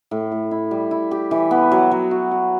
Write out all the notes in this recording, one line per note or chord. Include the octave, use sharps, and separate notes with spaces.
A2
A2
E4
G3
E4
G4
E3
B3
F#3
F#3
F#4
F#4